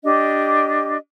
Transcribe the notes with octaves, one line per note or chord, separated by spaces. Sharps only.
D4 G4 D#5